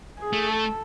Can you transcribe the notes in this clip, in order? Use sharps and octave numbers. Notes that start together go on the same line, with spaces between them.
G#4
A3
A4